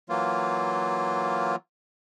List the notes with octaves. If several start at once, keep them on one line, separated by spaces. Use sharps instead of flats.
E3 F#3 A#3 F4